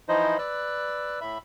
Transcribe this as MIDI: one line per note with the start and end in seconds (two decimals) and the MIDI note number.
0.09 0.37 52
0.09 0.37 53
0.09 0.37 63
0.09 0.37 64
0.09 0.37 72
0.09 0.37 75
0.39 1.20 71
0.39 1.20 74
0.39 1.20 88
0.39 1.20 90
1.21 1.38 45
1.21 1.38 76
1.21 1.38 83